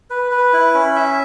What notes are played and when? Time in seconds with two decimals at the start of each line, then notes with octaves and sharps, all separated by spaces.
0.10 B4
0.31 B4
0.53 E4
0.75 C#4
0.95 E5